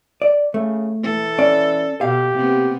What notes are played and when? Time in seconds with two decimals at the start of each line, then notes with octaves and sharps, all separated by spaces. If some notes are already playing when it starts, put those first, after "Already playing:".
0.22 D5
0.54 C#3 A3
1.03 E3 A4
1.39 C#4 D5
2.01 B2 G4 F5
2.34 C3 A#3 B3